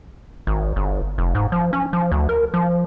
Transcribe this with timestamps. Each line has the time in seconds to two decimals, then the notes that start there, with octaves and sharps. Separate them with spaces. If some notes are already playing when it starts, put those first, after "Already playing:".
0.47 G#1
0.76 G1
1.18 F1
1.35 G#2
1.52 F3
1.73 C#4
1.93 F3
2.12 D2
2.29 A#4
2.54 F3